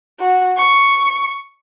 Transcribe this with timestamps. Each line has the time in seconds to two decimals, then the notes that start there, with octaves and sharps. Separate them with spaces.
0.19 F#4
0.56 C#6